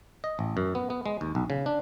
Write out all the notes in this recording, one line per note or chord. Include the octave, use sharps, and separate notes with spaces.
D#5
A1
F#2
B3
B3
G#3
D#2
B1
C#3
D4